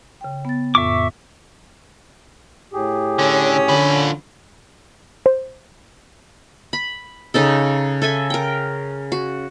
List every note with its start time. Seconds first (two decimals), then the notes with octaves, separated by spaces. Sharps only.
0.21 C#3 G5
0.45 B3 A6
0.75 F2 A2 E5 C#6 D6
2.73 A2 G4 G#4
3.19 D3 C#4
3.68 D3 F3 B5
5.26 C5
6.73 B5
7.34 C#3 D#4 A4
8.02 A4 E5 G#5
8.30 A#4 G5
9.12 F#4